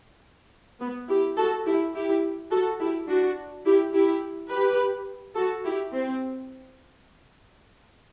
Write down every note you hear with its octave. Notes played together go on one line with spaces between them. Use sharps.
B3
E4 G4
F#4 A4
E4 G4
E4 G4
F#4 A4
E4 G4
D4 F#4
E4 G4
E4 G4
G4 B4
F#4 A4
E4 G4
C4